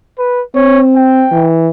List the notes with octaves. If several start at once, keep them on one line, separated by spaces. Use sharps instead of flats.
B4
C4 C#5
G5
E3